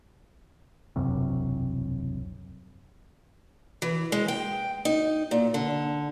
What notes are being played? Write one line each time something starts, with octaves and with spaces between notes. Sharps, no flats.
E1 C2 F#2 C3
E3
G#3
G5
D#4
A#2
D3